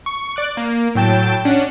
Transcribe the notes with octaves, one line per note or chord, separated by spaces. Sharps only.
C#6
D5 D6 F#6
A#3
A2 F#3 G5 A5
C#4 D4 F#5